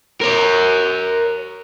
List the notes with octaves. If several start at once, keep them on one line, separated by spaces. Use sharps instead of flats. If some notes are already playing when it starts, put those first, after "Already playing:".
A#4 C#5